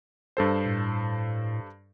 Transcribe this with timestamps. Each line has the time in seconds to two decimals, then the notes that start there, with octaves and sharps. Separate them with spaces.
0.37 G2 A4 C5
0.66 A2